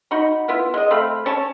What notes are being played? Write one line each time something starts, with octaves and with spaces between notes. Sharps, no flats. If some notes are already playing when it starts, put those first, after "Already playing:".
D#4 F#4 B5
B3 E4 F4
G#3 D#5
A3 C4 F5 B5
C#4 C#5 A5